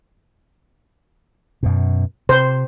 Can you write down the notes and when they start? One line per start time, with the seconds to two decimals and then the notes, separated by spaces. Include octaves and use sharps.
1.63 F#2 B2
2.29 C3 C5